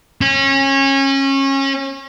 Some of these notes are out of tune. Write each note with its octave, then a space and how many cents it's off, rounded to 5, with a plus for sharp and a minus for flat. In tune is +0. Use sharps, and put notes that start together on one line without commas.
C#4 -25